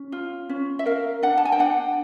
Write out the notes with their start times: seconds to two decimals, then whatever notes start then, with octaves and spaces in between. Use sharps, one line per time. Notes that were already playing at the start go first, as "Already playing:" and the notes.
Already playing: C#4
0.12 F4
0.49 C#4
0.79 E5
0.86 A#4 F5
1.23 D4 F#5
1.37 A5
1.45 G#5
1.52 G5
1.59 D4 F#5